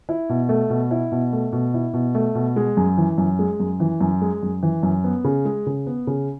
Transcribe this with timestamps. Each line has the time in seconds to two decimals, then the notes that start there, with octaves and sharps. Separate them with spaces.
0.09 E4
0.29 B2
0.49 A3
0.70 B2
0.91 E4
1.12 B2
1.33 A3
1.53 B2
1.74 E4
1.94 B2
2.15 A3
2.35 B2
2.56 G#3
2.77 F#2
2.98 E3
3.18 F#2
3.39 G#3
3.60 F#2
3.80 E3
4.01 F#2
4.22 G#3
4.43 F#2
4.63 E3
4.83 F#2
5.04 B3
5.24 C#3
5.45 G#3
5.66 C#3
5.87 B3
6.07 C#3